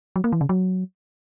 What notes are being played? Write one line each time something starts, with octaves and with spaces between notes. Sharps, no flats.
F#3
A#3
E3
C#3
F#3